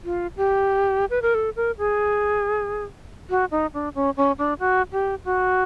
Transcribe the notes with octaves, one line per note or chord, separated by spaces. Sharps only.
F4
G4
B4
A#4
A4
A#4
G#4
F#4
D#4
D4
C#4
C#4
D4
F#4
G4
F#4